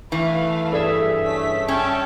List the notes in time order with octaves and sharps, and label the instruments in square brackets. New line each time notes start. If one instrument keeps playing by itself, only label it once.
[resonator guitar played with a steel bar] E3 [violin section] A3 B4 F5
[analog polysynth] G2 G#4 E5 [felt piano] A4 D5
[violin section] A3 C#4 B6
[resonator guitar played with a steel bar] C#4 [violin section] G5 A5 C#6